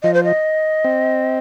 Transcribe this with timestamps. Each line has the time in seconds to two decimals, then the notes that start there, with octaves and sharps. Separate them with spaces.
0.03 F3 D#5
0.14 C5
0.24 D#5
0.85 C4